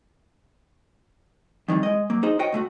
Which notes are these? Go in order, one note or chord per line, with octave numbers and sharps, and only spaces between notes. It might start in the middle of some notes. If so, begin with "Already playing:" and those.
F2 D#3 E3 G3
G#3 D#5
F#3 A#3
D#4 G#4 C5 D#5
F#4 C5 C#5 D#5 G5
B2 A3 F4 F#4